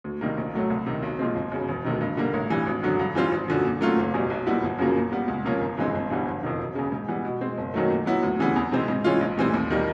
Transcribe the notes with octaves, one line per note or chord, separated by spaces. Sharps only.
D2
C3 D#3 G3 A#3
A#1
A2 F#3 A3
C2
C3 D#3
B1
A#2 F3 G#3 C4
G1
F#2 C#3
E1
D2 C3 D#3
G2
D3 G3 A#3
A1
G2 E3 G3
G#1
F#2 D3 F#3
G2
E3 G3 C4 F4
G#1
F#2 D3 F3
A#2
F#3 A3 C#4 F4
F#1
E2 B2 G3
B1
A#2 G3 B3 E4
G1
F#2 C#3 F3 A#3
A#2
G3 B3
C#2
C3 F3 A#3 C#4
G1
G2 E3 G#3 C4
G1
G2 E3 G3 B3
F#1
F2 C3 D#3
E1
E2 C#3
G#2
E3 G3 B3
B2
G#3 C4
F#1
F#2 D#3 F#3 A3
A#2
F#3 B3 E4
D2
C#3 E3 G3 B3
E2
C3 E3 G#3 C4
G#2
E3 G#3 C#4 F4
A#1
A2 E3 G3 C4
D#2
D#3 G3 A#3